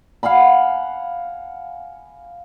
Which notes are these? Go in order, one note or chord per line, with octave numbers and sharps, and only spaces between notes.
F5 F#5 G#5 B5